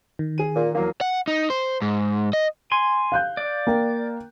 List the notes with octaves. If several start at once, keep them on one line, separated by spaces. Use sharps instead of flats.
D#3
G#4 D#7
A#2
E2 F#3 A#3
F#5
D#4
C5
G#2
D#5
G#5 C6
F5 F#6 G6
D5
A#3 A#4 G5